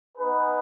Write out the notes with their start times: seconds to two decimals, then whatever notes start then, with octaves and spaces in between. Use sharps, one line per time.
0.16 B3 D#4 G#4 B4